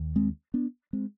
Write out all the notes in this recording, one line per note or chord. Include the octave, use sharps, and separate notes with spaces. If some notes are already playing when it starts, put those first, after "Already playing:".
Already playing: D#2
G#3 C4
B3 D4
G#3 C4